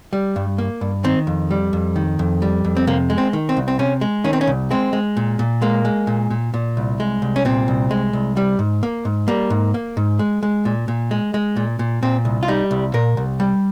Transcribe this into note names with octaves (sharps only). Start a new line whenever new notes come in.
G3
G2
A#3
G2
D#3 C4
F2
G3
F2
D#3
F2
G3
F2
C4
C3 A#3
G#3
C4
D#3
C4
C2
C4
C3 C#4
G#3
D#3 C#4
C4
C#4
C2
G#3 C4
G#3
A#2
A#2
G#3 A#3
G#3
A#2
A#2
A#2
C2
G#3
C2
C#4
A#2 C4
C2
G#3
C2
G3
G#2
A#3
G#2
G3 A#3
G#2
A#3
G#2
G#3
G#3
A#2
A#2
G#3
G#3
A#2
A#2
A#2 C4
C2
F4
G3 D#4
C2
A#2 A#4
C2
G3